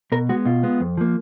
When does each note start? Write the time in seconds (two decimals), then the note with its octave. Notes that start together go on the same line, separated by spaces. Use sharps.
0.12 B2 A#4
0.29 G#3 B3 F#4
0.45 B2 F4
0.63 G#3 B3
0.80 F2
0.97 F3 A#3